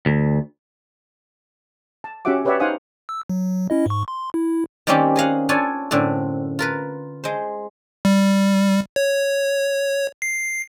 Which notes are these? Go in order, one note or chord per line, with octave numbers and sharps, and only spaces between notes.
D2
A5
C#4 F#4 G4 E5 F#5 D6
G4 B4 C#5 D5 E5 F#5
D#4 C5 F5 F#5 G#5 D#6
E6
F#3
C#4 E4 D#5
G#2 C#6
C6
E4
D#3 G3 A#3 C4 C#4 G4
G#4 D#5 F5 F#5
D4 F4 A4 C#5 G#5
F#2 A2 D3 C4
F4 A#4 B4
G#3 C5
G3
C#5
C7